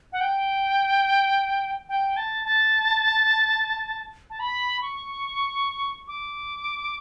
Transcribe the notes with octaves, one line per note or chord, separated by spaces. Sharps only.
F#5
G5
G5
A5
A5
A5
B5
C#6
D6